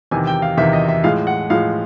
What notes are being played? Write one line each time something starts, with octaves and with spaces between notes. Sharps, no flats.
E2 C3 D#3 G#5
G5
F5
E2 C3 D#3 E5
D#5
E5
A2 F3 G#3 F5
F#5
A2 F3 G#3 F5